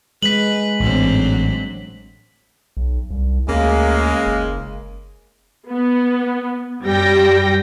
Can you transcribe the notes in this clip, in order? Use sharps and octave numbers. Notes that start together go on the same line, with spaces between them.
G#3 B4 B6 F#7
A1 G#2 D3 F#3 C4
B1
C2
D2 C#3 G#3 A#3
F#1
B3
F#2 G3 G5 A#6